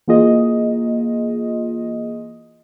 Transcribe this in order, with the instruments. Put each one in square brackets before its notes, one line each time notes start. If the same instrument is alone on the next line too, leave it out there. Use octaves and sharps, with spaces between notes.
[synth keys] E3 A#3 F4 G#4 D#5